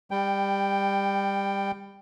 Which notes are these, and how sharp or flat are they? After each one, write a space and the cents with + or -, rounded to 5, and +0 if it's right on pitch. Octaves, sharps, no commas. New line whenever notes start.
G3 +20 G5 +0